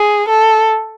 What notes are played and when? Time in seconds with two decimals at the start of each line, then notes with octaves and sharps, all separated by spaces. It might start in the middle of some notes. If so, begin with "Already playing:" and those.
Already playing: G#4
0.29 A4